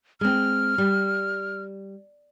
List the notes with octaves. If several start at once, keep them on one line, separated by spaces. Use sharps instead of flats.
G#3 C4 F6
G3